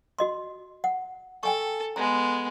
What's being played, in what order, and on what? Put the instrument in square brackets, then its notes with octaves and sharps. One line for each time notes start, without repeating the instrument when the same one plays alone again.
[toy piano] F#4 D#5 C6
F#5
[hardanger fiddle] A4 [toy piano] G5 G#5 C#6
[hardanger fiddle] G#3 B3 [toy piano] A#5